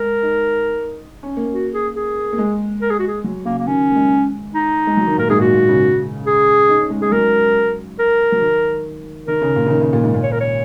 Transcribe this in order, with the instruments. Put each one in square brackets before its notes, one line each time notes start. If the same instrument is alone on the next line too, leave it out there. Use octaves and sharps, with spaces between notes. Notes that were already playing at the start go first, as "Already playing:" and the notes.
Already playing: [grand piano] G#3 [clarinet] A#4
[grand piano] D#4
C#4
A#3
[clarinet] F#4
G#4
G#4
[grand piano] A#3
G#3
[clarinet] A#4
G#4
F#4
G#4
[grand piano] F#3
[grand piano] C#3 [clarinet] A#3
[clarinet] A#3
[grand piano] D#3 [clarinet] C#4
[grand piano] A#3
G#3
[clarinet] D#4
[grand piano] G#3
F#3
D#3
[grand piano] A#2 [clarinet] A#4
[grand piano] G#2 [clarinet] G#4
[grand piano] A#2 [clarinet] F#4
[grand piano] A#2
C#3
[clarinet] G#4
[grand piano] D#4
C#4
G#3
[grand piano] G#3 [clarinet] G#4
[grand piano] F#3 [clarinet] A#4
[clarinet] A#4
[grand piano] F#3
D#3
[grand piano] D#3 [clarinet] A#4
[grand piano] C#3
A#2
C#3
D#3
C#3
A#2
G#2
A#2
[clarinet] C#5
A#4
C#5